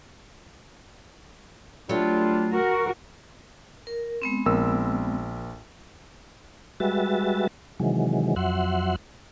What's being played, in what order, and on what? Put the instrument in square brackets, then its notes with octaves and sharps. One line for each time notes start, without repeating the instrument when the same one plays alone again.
[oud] F#3 A3 [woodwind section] G3 D4 F4
[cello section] F#4 A#4
[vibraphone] A#4
G#3 B3 C4
[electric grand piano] A#1 A#4 E6
[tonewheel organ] G3 G#3 F#4 B4 E5 A6
C3 D#3 E3 F#3 G#3
F2 F#3 E5 F#5 C6